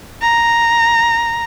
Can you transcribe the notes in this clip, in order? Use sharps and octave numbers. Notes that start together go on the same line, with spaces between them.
A#5